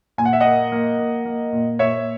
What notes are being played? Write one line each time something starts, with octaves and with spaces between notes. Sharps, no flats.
A#2 G#5
F#5
E5
A#3 D#5 F#5
A#3
A#3
A#3
A#2
A#2 C#5 E5